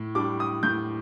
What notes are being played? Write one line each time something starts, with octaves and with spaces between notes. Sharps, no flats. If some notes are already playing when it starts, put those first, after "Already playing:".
Already playing: A2
G3 D4 D6
D#6
A2 G6